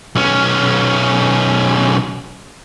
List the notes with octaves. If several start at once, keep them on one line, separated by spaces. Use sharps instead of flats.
B1 C#4